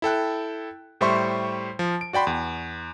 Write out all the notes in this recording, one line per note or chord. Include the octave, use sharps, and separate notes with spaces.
E4 A4 G5 F#6
A2 G3 C5 E5 C6 C#6
F3
D7
F#4 D5 G5 B5 C6
E2